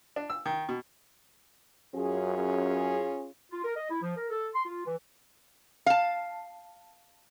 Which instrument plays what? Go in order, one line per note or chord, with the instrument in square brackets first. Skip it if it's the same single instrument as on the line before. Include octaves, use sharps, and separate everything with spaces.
[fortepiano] D4
E6
D#3
B2
[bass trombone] F#2 [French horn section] C#4 F4 G#4
[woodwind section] F4
A#4
D#5
E4
F3
A#4
A4
C6
F4
E3
[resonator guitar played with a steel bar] F5 A5